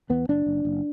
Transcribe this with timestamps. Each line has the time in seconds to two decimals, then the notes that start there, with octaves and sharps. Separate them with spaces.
0.10 E2 B3
0.29 F#1 D4
0.46 F#1
0.65 F#1